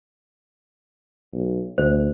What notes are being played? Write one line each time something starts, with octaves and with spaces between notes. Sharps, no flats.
B1
D2 C5